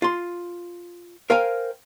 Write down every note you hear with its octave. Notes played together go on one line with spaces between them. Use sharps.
F4 C6
A#4 C5 F5 G5 G#5